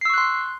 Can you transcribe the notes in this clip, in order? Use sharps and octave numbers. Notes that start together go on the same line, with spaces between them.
C6 C#6 E6 F#6 C7